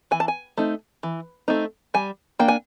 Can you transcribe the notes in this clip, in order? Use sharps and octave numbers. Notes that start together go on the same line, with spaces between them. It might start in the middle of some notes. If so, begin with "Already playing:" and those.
E3 G#5
A5
G#5
A3 C4 D#4
E3
A3 C4 D#4
G3 G#5
A#3 D4 G5
G#5